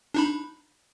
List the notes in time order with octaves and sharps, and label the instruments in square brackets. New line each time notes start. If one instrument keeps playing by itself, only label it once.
[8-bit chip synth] D4 D#4 B5